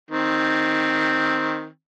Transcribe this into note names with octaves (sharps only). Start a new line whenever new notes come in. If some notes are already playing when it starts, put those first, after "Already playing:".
D#3 C4